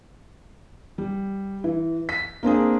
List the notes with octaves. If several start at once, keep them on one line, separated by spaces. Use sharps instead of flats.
G3
E3
B6
A#3 C4 D4 G#4